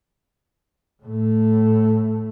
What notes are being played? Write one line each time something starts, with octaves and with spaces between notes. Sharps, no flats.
A2 A3